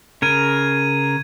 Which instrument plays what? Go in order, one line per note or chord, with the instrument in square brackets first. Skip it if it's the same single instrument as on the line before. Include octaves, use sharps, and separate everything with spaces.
[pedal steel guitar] C#3 A#4 [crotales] G#6 D#7